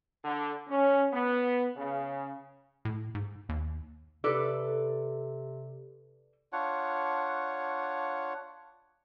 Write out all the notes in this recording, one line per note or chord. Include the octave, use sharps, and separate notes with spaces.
D3
C#4
B3
C#3
A2
G#2
D#2
C3 A4 B4 D5
D4 F4 C#5 F#5